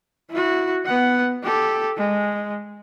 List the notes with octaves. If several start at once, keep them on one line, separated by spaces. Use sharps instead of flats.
E4 F#4
B3 F#5
G4 A4
G#3